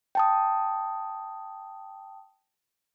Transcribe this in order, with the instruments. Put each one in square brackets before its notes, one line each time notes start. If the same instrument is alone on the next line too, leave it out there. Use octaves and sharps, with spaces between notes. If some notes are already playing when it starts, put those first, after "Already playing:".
[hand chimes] G5 A5 D#6